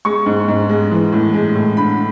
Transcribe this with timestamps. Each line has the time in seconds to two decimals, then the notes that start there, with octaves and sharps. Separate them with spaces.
0.05 G#3 C#6
0.26 G#2
0.48 G#2
0.69 G#3
0.91 E3
1.12 A2
1.34 G#3
1.55 A2
1.77 D3 B5